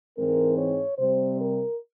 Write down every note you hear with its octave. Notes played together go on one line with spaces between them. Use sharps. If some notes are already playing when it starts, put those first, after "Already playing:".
G#2 E3 G#3 C4 A#4
C#5
C3 G3 C4 C5
A#4